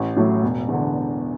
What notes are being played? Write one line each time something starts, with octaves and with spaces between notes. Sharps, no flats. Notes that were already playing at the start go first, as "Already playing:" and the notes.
Already playing: A1
A2 F#3 A3
E1
E2 D3